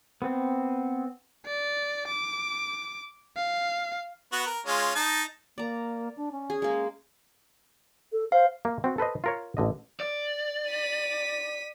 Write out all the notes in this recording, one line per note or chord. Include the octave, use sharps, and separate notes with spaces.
B3 C4
D5
D6
F5
B3 F#4
A#4
G#3 C#4 F4
D#4 A5
A#3 D5 A#5
D4
C#4
G#4
G#3 A#3
A4
C5 F5
A#3
C4 F#4
A4 B4 C5 D#5
F4 A#4 C#5
A1 D3 D#5
D5
B6 D#7